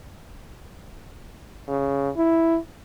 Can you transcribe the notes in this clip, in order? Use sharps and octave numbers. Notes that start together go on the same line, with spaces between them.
C#3
E4